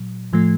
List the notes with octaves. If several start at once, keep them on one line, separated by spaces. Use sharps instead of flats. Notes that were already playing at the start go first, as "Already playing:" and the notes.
Already playing: A#2 F#3
A2 F3 A3